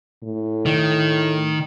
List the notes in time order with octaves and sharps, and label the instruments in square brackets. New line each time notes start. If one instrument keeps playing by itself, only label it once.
[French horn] A2
[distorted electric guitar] D#3